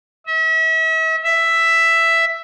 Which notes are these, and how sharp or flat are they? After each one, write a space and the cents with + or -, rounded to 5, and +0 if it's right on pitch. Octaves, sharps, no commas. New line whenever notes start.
E5 -40
E5 +5